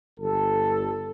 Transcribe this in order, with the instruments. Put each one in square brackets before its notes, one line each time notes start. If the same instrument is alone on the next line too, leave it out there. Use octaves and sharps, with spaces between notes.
[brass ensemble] G1 G4 A4